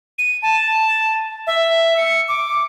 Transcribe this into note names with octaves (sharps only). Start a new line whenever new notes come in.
D#7
A5
E5
C#7
D6